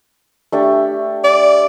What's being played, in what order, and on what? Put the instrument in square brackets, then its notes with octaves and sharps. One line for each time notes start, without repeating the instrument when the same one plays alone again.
[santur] A3 D4 G4
[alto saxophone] D5